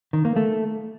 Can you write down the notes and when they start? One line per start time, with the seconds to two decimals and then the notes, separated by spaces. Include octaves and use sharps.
0.13 D#3
0.25 A#3
0.36 A3